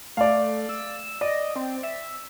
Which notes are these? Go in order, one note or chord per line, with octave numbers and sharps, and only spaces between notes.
A3 D5 F5
E6
D5 D#5
C4
E5